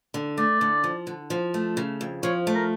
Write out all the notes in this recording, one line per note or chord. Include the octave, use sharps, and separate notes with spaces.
D3
A3 D5
D3
F3
D3
F3
A3
C#3
F2
F3 C#5
A3
A#4